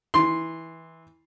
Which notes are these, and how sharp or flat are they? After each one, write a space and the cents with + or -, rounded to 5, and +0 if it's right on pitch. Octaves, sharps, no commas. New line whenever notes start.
E3 -15 C6 +0